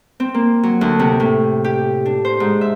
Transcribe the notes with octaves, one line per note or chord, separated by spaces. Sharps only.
C4
A#3
F#3
D2
C3
A2
G4
D4
C5
G#2
E5